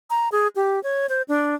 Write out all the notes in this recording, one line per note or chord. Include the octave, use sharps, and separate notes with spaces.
A#5
G#4
G4
C#5
C5
D4